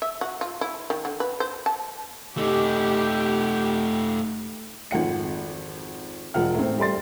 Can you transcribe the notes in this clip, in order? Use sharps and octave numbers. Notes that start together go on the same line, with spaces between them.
E5
F#4
F4
E4
D#3
D3
B4
C5
A5
A3 D#4 G4
G#1 F2 F#5 C#7
E1 F3 F#5 F6
A2 C4
G3 A3 D5 C6 A6